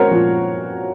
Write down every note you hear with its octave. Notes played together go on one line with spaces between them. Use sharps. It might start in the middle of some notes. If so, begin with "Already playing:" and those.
Already playing: F#4 A#4 C5 C#5
A#2 F3